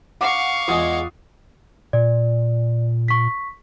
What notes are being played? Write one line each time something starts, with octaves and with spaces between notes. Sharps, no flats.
F5 F#5 C#6 D6
E2 G#3 F4 F#5 D#6
A#2 D5
C#6 B6